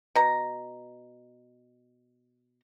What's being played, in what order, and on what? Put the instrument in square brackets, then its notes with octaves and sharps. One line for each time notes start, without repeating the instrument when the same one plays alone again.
[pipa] B2 A#5